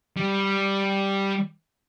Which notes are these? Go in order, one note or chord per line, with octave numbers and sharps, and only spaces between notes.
G3